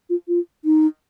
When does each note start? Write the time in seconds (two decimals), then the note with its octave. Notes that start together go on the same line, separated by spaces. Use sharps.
0.10 F4
0.28 F4
0.65 D#4